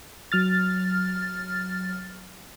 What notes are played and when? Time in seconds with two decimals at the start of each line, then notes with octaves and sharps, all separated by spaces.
0.32 F#3 F6 A6